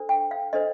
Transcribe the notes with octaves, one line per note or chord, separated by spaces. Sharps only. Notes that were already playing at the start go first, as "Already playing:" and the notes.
Already playing: D4 A4 C5
G5
F5
D4 A4 C5 D#5